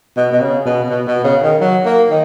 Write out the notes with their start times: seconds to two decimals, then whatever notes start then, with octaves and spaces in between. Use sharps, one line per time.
0.16 B2
0.31 B2
0.41 C#3
0.65 B2
0.89 B2
1.07 B2
1.24 C#3
1.43 D#3
1.60 F#3
1.85 A#3
2.10 D#3